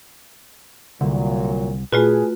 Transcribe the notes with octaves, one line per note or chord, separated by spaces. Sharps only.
C2 A#2 D3 F#3
A#2 A3 F4 F#4 G#4 B4